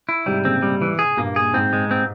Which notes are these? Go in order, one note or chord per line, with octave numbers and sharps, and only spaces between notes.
E4
G#2 C3 G3
A#2 C#3 C4
G3
E3
G#4
G2 A#2 A#3
G#4
G#2 C4
G#3
C4